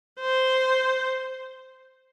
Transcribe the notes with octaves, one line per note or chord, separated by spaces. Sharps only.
C5